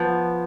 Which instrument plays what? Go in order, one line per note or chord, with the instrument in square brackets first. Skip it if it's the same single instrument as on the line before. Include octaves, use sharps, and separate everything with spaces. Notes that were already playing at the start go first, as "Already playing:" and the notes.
Already playing: [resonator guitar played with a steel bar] F3 B3